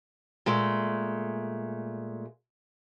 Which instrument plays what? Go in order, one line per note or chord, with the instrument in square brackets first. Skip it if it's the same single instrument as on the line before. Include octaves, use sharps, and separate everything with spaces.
[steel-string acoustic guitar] A#2 G#3 A3